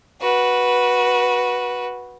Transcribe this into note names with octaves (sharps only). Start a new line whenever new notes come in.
F#4 B4